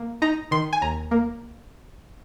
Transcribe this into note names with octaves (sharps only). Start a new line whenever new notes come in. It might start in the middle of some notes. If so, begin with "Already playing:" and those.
Already playing: A#3
D#4 A#5
D#3 C6
G#5
D#2 A#5
A#3